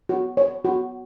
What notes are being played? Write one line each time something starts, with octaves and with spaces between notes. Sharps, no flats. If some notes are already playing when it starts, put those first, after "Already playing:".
F#4
C#5
F#4